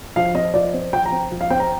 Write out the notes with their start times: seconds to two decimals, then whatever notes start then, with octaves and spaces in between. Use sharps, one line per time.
0.16 F3 F5
0.35 C4 D#5
0.54 F3 D5
0.74 C4
0.93 F3 G5
1.06 A#5
1.12 C4
1.31 F3
1.41 F5
1.50 C4 G5
1.60 A#5